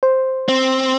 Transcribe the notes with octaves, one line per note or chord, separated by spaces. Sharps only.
C5
C4